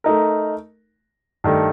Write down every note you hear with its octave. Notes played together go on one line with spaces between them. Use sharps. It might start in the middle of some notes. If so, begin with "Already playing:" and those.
A3 D#4 A#4
G2 D#3 A3